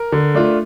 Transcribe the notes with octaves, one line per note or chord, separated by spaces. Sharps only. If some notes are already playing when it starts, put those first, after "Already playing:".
Already playing: A#4
D3
A3 D4 F4